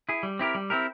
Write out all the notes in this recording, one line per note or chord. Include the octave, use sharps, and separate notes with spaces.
E4 G#4
G3
C4 E4 G4 A#4
G3
C4 E4 G4 A#4